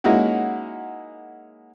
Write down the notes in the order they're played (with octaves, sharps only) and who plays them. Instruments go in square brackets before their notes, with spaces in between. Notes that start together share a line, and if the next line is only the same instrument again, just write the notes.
[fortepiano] G#3 A#3 C#4 D#4 E4 F#4